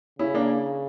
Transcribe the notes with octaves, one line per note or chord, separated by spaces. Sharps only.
C#3 C#4 E4
A#3 D4